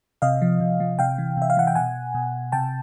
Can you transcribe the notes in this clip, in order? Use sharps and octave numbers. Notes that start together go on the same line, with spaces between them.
C3 D#5 F5
F3
C3
F3
C3 F5 G5
E3
C3 E5
F5
E3 F#5
G5
B2 F#5 G#5
B2
C3 G5 A5